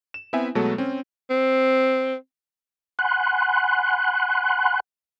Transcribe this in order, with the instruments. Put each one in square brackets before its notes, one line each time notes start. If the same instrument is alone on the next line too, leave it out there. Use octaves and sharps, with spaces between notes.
[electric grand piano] E7
B3 C4 E4 E5 G#5
B2 F#3 G#3 A3 B3 A4
C4 C#4
[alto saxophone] C4
[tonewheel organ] F#5 G#5 B5 C6 F#6